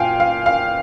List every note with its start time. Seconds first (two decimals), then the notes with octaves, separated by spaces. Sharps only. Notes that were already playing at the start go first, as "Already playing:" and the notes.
Already playing: A#2 F5 G5 G#5
0.20 F5
0.46 F5